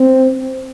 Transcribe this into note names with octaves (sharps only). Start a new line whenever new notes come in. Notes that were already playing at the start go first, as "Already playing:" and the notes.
Already playing: C4